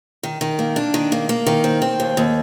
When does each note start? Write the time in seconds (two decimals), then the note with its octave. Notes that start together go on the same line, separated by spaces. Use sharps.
0.23 D#3
0.41 D#3
0.59 A#3
0.76 D4
0.94 D#3
1.12 A#3
1.29 A#3
1.47 D#3
1.64 C4
1.82 C4
2.00 D#2
2.17 D#2